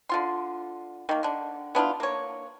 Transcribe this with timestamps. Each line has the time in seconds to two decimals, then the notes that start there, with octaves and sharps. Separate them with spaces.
0.09 D3 F4 C6
1.09 D#3 A#3
1.23 D3 D4
1.75 B3 D4 E4 F4
2.00 A#3 C#5